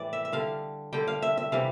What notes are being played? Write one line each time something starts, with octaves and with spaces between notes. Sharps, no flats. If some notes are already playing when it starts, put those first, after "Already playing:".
Already playing: A2 E3 G3 D5
E5
E5
D3 G3 F5
D3 G3 G5
F5
E5
E5
C3 E3 G3 F5